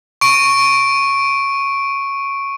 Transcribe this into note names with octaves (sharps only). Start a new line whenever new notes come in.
C#6 D7